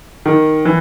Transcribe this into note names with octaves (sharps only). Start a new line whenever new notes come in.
D#3
E3